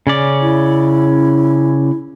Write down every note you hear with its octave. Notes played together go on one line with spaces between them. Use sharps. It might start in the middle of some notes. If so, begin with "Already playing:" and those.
C#3 C#4 D5
E4